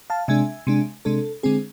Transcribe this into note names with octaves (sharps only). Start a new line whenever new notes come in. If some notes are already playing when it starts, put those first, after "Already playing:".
F5 A5
C3 G#3 D4 E5 G#5
C3 G#3 D4
C3 G#3 D4 A4
D3 G#3 C4 G#4